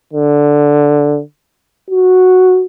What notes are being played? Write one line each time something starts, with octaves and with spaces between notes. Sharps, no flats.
D3
F#4